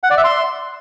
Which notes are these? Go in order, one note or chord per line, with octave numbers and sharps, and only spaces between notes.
F#5
D5
E5
C6